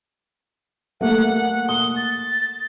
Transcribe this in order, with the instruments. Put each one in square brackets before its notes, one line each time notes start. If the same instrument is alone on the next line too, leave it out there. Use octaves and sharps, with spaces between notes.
[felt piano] A3 A#3 A4 [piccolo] F#5
[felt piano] D#6 [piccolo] G7
[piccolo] A6